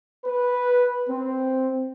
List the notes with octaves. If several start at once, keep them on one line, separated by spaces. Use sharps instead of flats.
B4
C4